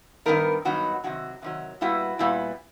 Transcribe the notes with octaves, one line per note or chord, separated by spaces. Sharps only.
G2 D#3 F#3 B3 D#4 A#4
G2 D#3 F#3 B3 D#4 F#4
C3 D#3 F#3 F#4
C3 D#3 F#3
A#2 G3 B3 E4 F#4
A#2 G3 B3 E4